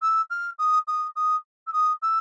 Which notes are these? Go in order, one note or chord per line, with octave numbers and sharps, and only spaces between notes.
E6
F6
D#6
D#6
D#6
E6
D#6
E6